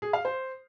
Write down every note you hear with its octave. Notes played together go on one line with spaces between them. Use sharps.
G#4
F5
C5